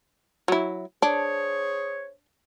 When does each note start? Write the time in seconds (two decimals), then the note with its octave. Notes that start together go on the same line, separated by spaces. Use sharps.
0.48 F#3 E4
1.02 D4 G#4 C5 C#5